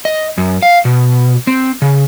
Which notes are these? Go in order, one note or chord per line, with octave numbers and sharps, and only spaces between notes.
D#5
F#2
F5
B2
C4
C#3